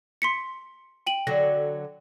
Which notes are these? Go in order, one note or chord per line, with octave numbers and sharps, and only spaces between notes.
C6 B6 C#7
G5 D#7 F#7
D3 F#3 A#6